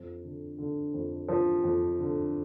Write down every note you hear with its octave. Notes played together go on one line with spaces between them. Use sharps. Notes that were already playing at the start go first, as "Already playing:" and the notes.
Already playing: F2
D3
D3
F2
F3
F2
D3